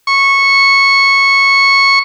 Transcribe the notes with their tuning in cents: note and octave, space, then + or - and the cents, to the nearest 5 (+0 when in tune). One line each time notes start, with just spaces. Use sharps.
C#6 -10